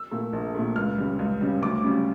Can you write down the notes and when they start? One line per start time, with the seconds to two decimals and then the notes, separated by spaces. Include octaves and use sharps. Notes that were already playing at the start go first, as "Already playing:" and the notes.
Already playing: E6
0.11 A#2 A3
0.33 A#1
0.55 A#2 A3
0.76 C#2 F6
0.98 C#3 G3
1.19 C#2
1.41 C#3 G3
1.62 D2 D6
1.84 C#3 G3